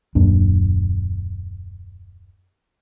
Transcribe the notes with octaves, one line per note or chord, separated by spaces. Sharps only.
D#1 F#2 A#3 D4